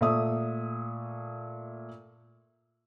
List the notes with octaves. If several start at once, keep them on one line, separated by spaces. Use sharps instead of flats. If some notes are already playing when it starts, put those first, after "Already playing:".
A#2 A3 E5 D#6